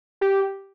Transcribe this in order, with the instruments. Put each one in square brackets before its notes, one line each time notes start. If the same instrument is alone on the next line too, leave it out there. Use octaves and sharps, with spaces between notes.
[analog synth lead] G4